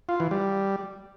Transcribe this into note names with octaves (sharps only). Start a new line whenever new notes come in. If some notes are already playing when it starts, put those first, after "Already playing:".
F4
E3
G3